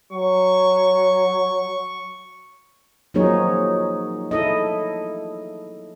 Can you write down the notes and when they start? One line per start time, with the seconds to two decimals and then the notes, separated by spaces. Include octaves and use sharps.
0.13 F#3 C#6
3.14 F3 F#3 A#3 D#4 G#4 C#5
4.31 E4 A4 D#5